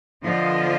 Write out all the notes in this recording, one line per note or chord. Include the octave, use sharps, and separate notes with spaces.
D3 F3 B3 F4 D#5